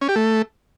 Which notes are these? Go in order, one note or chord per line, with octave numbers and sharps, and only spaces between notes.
C#4
G4
A3